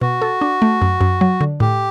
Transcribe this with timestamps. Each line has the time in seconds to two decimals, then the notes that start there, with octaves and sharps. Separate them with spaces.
0.02 B2 F#4
0.22 A4
0.41 D4
0.62 A3
0.82 F#2
1.01 F#2
1.21 F#3
1.41 D3
1.60 A2 G4